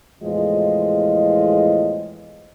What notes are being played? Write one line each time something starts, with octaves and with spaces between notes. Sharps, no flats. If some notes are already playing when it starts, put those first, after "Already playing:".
E2 A2 F3 G#3 F4 D#5